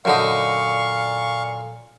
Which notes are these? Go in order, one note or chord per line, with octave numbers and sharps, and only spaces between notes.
F#2 A#2 D3 D#4 F5 C#6